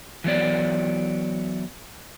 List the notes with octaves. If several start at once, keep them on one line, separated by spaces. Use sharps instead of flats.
E3 F#3 B3 D5